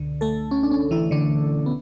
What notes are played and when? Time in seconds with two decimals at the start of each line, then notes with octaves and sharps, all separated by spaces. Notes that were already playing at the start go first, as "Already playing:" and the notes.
Already playing: C#2 B2 D3
0.21 A3 A4
0.51 C#4
0.63 D4
0.71 C#4
0.91 E3 E4
1.11 D3 D4
1.66 B3